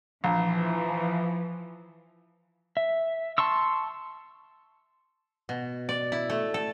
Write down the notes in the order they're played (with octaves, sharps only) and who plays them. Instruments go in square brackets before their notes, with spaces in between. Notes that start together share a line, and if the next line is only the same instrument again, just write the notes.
[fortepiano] A#1 [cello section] E3 F3
[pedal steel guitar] E5
A5 C6 C#6 E6
[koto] B2
D5
E4
A3
A4